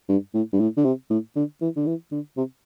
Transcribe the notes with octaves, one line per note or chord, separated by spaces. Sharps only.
G2
A2
G2
A2
D3
C3
A2
D3
E3
D3
E3
D3
C3